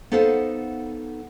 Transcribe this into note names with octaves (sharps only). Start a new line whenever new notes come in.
B3 D#4 A4 C5 F5 F#5